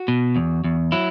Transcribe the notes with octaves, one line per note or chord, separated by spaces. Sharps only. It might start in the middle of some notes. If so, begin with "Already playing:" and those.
Already playing: F#4
B2
E2
E2
F#3 E4